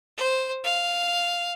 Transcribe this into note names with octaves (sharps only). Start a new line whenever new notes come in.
C5
F5